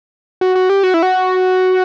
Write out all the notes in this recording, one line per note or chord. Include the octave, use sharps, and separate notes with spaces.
F#4
F#4
G4
F#4
E4
F#4